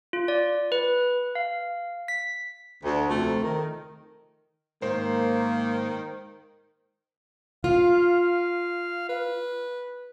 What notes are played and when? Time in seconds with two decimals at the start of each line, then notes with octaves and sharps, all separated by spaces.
0.13 F4
0.28 D5
0.72 B4
1.35 F5
2.08 B6
2.84 D2
3.09 F2 C3 A3
3.43 D#3
4.82 G#2 D#3 A#3 C5
7.64 F4 F5
9.09 B4